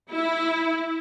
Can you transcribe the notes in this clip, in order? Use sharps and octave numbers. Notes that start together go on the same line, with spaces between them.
E4